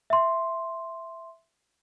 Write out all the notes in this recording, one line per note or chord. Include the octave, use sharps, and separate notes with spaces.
E5 C6